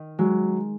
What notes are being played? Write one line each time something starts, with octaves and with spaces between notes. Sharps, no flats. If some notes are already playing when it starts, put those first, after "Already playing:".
Already playing: D#3
F#3 G#3